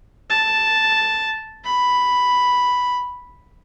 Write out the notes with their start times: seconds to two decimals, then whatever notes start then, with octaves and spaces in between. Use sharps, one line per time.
0.30 A5
1.65 B5